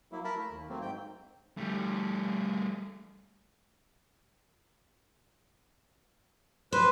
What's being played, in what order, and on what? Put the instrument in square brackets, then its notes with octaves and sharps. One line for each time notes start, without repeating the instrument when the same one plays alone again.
[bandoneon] F#3 A#3 E4
A#4 A5 B5
A3
D#2
F#3 A3 A#3 C4
G#2 G5
[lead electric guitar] G3 A3
[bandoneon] B4 [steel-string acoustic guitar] C5